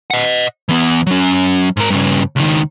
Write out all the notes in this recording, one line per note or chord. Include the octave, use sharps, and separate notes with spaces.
D#5 F#5
E3 B3
F#3 C#4
G#2 A#4
G2 C#3
C#2 D#3